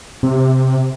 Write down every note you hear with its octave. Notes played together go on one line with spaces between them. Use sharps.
C3